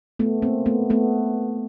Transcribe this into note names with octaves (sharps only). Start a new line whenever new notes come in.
A3 B3
A#3 C4
A3 B3
A3 B3